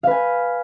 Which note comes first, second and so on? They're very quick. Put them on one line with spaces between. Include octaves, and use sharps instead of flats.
F5 B4 G#5